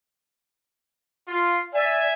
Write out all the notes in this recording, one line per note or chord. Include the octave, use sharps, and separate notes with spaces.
F4
D5 E5 G#5